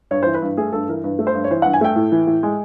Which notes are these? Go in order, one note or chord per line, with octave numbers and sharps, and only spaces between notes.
G2 C#5
E3 C5
B4
G2
A3 G#4
G2 A4
E3 A#4
G2 B4
A3
C5
G2
C#5
E3 C5
G2 F#5
G#5
A3 G5
A2
E3
A2
G#3